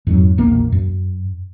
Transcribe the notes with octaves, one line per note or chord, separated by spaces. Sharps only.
F2 G#2 F#3
E1 A#1 A#3
F#2